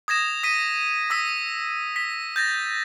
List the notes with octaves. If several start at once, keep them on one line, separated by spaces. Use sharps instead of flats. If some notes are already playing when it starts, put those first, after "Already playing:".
D#6 G#6 A#6 E7
D#6 B6 D#7
D#6 E6 B6
B6
G6 A6 A#6